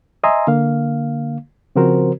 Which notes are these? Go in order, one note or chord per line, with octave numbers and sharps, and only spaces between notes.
D#5 E5 G#5 A#5 C6 D#6
D3 A#3 F5
C#3 F3 C4 F#4 A#4 C5